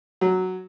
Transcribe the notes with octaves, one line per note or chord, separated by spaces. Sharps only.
F#3